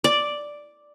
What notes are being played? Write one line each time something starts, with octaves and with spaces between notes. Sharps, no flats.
D5